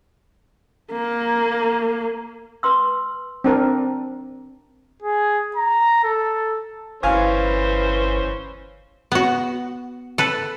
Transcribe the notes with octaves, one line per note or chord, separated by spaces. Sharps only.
A#3
B4 C6 E6
C4 D4 A#4
G#4
A#5
A4
G1 E3 C#4 B4 C5 F5 G#5 C#6
B3 F#4
A4 B4